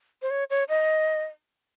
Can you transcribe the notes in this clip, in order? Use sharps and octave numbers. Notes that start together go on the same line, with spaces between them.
C5
C#5
C#5
D#5